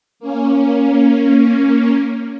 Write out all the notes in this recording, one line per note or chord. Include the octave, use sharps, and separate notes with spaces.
A#3 C#4